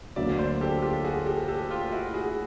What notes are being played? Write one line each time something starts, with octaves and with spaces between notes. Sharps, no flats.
D2 D3 F#3 A#3 D5 E5
C5 D5
G4 A4
F4 G4
F#4 G#4
G4 A4
G4 A4
F4 G4
E4 F#4
F#4 G#4